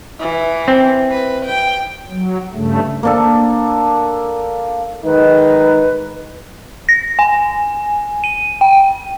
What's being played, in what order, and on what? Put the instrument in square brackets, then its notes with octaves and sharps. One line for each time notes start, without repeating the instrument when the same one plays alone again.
[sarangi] E3
[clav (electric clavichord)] C4
[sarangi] B4
G5
[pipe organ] F#3
G2 C#3 A3
[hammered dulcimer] A#3 D4 A4
[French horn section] D#3 G#3 D#4 [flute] B4
[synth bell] A#6
G#5
D#7
G5